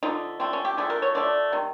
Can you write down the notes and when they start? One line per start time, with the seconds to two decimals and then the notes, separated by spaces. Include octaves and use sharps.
0.03 D3 F3 A3 D#4
0.40 D3 F3 A3 C4
0.53 C#4
0.65 G4
0.77 D3 F3 A3 G#4
0.90 A#4
1.02 C#5
1.15 D3 F3 A3 D5
1.52 C3 D#3